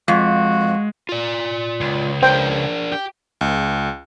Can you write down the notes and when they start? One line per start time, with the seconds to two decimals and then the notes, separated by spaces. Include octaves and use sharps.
0.08 F2 G#3 F#4 F5
1.09 F4 D5
1.81 C#2
2.23 D4 A#4 C5 F5 G5
2.92 G4
3.41 C#2